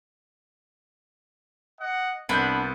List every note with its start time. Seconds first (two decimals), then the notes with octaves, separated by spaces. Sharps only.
1.80 D#5 F#5
2.29 C2 B3 D4 B5 G6